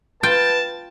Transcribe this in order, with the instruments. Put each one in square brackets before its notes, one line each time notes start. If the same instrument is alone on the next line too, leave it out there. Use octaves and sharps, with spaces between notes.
[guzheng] F4 G5 [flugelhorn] B4 [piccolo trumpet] A5